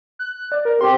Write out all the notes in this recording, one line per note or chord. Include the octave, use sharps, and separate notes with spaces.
F#6
D5
A#4
C4 G4 C6